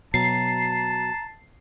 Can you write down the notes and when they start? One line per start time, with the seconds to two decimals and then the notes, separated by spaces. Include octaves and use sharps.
0.14 B2 F#3 A5 A#5 C7